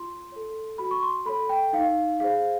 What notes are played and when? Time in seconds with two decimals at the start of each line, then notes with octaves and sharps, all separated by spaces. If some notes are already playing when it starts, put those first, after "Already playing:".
Already playing: F4 C6
0.32 A4 C#5
0.78 F#4 B5
0.91 C#6
1.03 C6
1.25 A4 C#5 B5
1.49 G5
1.73 D#4 F5
2.20 G#4 C5 F5